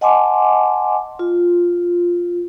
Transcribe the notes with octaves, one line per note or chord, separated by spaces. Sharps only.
D#5 F#5 G#5 A5 C6 D6
F4